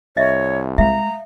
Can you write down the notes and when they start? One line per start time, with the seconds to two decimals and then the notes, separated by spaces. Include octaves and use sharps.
0.17 C2 C#5 D#5 E5
0.78 G#3 E5 F5 A#5